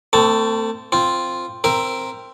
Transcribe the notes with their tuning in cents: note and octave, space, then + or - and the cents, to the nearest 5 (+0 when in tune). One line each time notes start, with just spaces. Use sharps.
A3 +35 C4 -20 A5 +0
C4 +0 F4 +0
C4 +0 A#4 +0 E5 +10